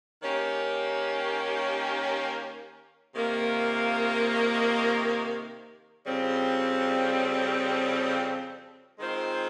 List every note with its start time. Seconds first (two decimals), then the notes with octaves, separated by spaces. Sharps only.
0.21 D#3 A#3 C#4 G4 C#5
3.14 C3 D#3 A#3 F4
6.06 F2 C#3 G3 C4
8.99 D#3 G#3 C4 F4 C5